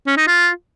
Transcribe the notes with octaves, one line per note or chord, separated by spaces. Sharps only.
C#4
D#4
F4